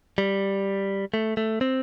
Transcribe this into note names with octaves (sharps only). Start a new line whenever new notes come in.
G3
A3
A3
C4